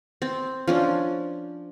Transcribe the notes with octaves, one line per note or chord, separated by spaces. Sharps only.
C4
F3 C#4 D4